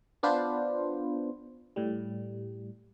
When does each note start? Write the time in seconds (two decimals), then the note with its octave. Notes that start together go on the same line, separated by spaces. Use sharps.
0.23 B3 D4 F4 B4 C5
1.76 A2 G3